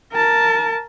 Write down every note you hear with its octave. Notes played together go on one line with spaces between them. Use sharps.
A#4 A5